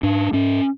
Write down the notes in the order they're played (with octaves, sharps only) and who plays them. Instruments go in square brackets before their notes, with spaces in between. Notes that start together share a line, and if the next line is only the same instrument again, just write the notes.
[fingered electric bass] G#2 D4
G#2 C#4